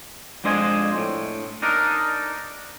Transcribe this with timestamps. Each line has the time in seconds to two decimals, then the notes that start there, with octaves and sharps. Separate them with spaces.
0.44 F2 G#3 D4 C5 D#5 G#5
0.96 A2
1.62 D4 D#4 A#4